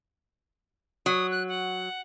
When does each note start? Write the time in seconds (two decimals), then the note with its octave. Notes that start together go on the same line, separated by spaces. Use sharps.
1.06 F#3 D#6
1.31 F#6
1.48 F#5